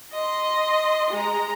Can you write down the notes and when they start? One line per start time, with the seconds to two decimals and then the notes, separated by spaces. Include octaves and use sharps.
0.12 D#5 C6
1.10 G#3 A#5